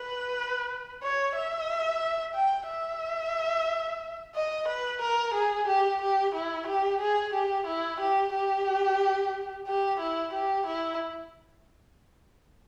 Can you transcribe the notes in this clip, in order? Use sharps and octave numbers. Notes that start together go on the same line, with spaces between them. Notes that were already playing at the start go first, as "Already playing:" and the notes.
Already playing: B4
C#5
E5
G5
E5
D#5
B4
A#4
G#4
G4
G4
E4
G4
G#4
G4
E4
G4
G4
G4
E4
G4
E4